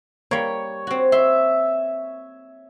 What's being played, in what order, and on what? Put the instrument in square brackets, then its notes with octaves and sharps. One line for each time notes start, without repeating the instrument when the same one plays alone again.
[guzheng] G3 A#3 [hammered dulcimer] C#5
[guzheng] C4 F#4
[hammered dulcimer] E5 [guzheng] C6